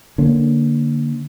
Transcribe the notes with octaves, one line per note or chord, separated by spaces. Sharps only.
D3 A#3 C#4